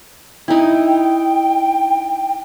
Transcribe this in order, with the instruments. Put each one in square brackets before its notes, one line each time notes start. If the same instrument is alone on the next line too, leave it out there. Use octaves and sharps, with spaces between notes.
[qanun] D#4 E4 [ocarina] G5